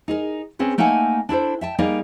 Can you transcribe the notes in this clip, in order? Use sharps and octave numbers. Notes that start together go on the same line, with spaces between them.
D#4 G#4 A#4
C4 C#4 G#4 B4
A3 A#3 D#4 A4 F#5 G#5
D4 E4 A4 C5
E5 G5 A5
G3 A#3 D#4 G#4 A#4 D5